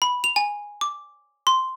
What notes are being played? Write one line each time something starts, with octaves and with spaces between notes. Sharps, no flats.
B5
F7
G#5
D6
C6